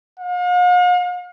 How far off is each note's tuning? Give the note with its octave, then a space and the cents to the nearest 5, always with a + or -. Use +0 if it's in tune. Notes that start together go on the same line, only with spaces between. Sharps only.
F5 +45